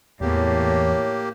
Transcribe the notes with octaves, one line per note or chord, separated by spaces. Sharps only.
E2 A2 A#3 G4 C#5